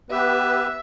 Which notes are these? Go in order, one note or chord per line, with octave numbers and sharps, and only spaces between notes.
B3 G4 B4 E5